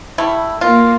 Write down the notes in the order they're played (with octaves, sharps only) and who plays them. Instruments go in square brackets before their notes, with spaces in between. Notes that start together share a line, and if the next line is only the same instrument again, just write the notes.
[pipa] G3 A3 E4
[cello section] A#3 [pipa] F4